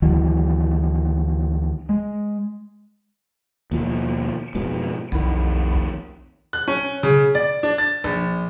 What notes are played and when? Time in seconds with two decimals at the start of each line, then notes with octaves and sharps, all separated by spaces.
0.02 D2 D#3 E3 F#3
1.89 G#3
3.72 D#2 B2 F3
4.55 F2 G#2 B2
5.12 B1 F2 D#3
6.53 F#6
6.68 C#4
7.03 C#3
7.35 D5
7.63 D4
7.78 A6
8.04 A#1